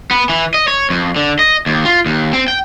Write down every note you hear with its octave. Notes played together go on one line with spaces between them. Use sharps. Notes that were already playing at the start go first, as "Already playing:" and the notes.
B3
E3
D#5
C#5
F2
D3
D#5
D#2
F4
D#2
C4
G5